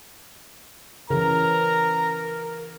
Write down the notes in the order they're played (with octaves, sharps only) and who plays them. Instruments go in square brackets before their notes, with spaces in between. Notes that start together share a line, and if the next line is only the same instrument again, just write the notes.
[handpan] C#3 E3 [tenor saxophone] A#4 [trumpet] A#5